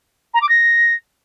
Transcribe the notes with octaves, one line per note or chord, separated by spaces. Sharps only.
A#5
D6
A#6